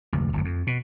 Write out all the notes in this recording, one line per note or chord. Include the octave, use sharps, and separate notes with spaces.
F1 D2
D1 G1 F2
F2
B2